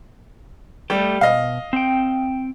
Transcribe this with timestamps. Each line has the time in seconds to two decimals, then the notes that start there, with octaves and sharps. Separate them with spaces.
0.90 G3 A3 G4
1.21 B2 D#5 F5
1.73 C4 G5